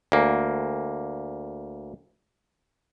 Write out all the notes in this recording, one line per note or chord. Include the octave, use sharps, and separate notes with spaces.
D2 A#3